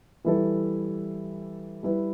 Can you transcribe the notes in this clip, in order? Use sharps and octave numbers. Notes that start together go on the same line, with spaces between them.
E3 G3 E4 A4
G3 E4 B4